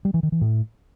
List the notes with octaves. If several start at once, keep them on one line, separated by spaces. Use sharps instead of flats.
G3
E3
D#3
E3
A2